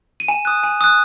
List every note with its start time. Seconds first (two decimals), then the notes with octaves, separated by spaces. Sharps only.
0.20 D#7
0.28 G#5 E7
0.45 D#6 F#6
0.63 G#5
0.81 D#6 F#6